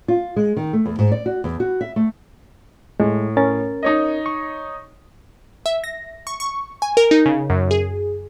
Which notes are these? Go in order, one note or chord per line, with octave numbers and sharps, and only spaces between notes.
F4
G#3
D#3
A3
E2
G#2
D5
F#4
E2
F#4
E5
A3
A2 G#3
C#4 A#4 A6
D#4 C#5 D#5
C#6
E5
A#6
C#6
C#6
G#5
A#4
D#4
C#3
F#2
G#4